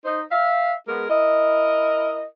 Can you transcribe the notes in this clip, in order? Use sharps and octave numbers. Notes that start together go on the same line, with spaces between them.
D#4 C5
E5 F5
G#3 B3 G#4 A#4
E4 A#4 D#5